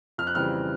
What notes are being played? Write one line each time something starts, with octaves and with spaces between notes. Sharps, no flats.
F2 F6
F#6
C#3 E3 G3 C4 F6